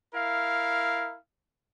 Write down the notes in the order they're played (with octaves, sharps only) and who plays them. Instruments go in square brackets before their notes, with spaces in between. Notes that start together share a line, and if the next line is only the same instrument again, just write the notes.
[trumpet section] E4 A#4 F5